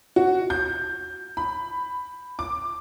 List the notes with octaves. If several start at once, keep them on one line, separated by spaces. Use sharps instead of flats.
F#4
G6
B5
D6